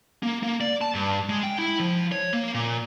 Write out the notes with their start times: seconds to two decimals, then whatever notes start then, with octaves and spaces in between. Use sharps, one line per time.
0.23 A#3
0.43 A#3
0.61 D5
0.81 A5
0.95 G2
1.29 G#3
1.43 G5
1.59 E4
1.80 F3
2.12 C#5
2.33 A#3
2.54 A#2